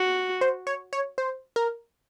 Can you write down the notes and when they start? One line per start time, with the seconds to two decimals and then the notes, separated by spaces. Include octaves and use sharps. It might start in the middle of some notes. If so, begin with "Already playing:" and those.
Already playing: F#4
0.41 C5
0.67 C#5
0.93 C#5
1.18 C5
1.56 A#4